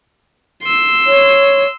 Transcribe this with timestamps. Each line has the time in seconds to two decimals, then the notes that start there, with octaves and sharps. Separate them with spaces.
0.63 C6 E6
1.07 C#5